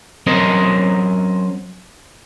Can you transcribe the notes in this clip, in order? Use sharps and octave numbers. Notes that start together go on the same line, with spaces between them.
F#3 C4 C#4 A#4 C5 D#5